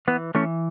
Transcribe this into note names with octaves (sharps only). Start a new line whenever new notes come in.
E3 B3
E3 A3 C#4